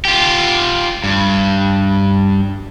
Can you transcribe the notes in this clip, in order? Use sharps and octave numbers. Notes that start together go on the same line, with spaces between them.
F4 G4
G2